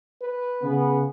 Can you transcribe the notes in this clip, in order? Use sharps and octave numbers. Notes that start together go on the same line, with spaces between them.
B4
C#3 B3